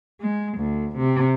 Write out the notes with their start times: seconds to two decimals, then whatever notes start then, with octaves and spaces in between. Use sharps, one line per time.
0.21 G#3
0.58 D2
0.98 C3